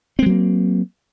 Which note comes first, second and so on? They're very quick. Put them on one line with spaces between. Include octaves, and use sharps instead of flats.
C4 G#3 F#3 A#3